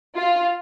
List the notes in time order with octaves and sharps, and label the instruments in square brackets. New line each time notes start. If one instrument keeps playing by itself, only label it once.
[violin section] F4